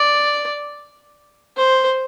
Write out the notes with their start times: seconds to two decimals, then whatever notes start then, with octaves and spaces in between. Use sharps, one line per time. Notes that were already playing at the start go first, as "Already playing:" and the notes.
Already playing: D5
1.57 C5